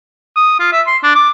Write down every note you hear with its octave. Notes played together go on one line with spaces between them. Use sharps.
D#6
F4
E5
C6
D4
D6